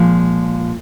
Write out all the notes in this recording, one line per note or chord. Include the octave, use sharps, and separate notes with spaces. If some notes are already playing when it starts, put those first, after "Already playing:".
Already playing: A#2 F3 G#3